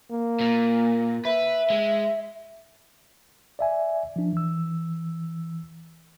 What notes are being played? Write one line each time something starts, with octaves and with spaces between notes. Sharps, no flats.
A#3
A#2
B4 E5
G#3
D5 E5 G#5
F3 D4
E3 E6